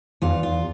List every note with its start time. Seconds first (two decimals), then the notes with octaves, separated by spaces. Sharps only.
0.22 E2 F4
0.43 F4